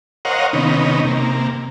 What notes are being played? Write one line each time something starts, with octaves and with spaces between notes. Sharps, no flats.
A#4 C5 C#5 D#5 F5 F#5
C3 D#3 B3 C#4 D#4
C3 A#3